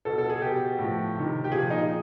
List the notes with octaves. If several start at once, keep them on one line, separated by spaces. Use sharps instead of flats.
B2 A4
A4
G#4
B2 G4
A2 F3
C3 D#3
G4
A#2 F3 G#4
D#4